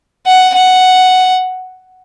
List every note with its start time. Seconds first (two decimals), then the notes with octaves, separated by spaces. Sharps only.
0.27 F#5
0.55 F#5